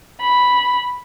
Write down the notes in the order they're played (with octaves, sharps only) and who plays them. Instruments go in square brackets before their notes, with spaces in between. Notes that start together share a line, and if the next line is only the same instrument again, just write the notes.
[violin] B5